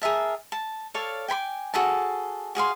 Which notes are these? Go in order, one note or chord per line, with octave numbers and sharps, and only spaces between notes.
G#4 A#4 E5 A5
A5
A4 C#5 D5 F5
G5 G#5 B5 D6
F#4 G#4 A4 A5
F#4 G#4 F5 C6